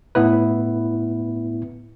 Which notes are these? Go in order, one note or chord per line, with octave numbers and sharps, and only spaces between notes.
A2 B3 E4 B4